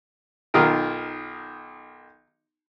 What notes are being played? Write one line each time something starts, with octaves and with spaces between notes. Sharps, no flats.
B1 D#3 F4 A#4